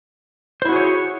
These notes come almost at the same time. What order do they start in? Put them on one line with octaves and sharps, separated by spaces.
C5 E4 F#4 G#4 C#5